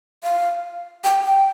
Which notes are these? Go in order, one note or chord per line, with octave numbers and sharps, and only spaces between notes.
F5
G5
G5